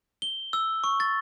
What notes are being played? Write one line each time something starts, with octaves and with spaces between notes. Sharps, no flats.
G7
E6
C#6
A6